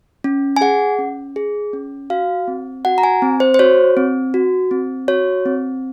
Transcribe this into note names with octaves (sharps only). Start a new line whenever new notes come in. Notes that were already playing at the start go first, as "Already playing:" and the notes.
C#4
G#5
G#4 F#5
C#4
G#4
C#4
F#4 F5
C4
F#4 F#5
A#5
G#5
C4
C5
C5
F#4 C#5
C4
F#4
C4
F#4 C#5
C4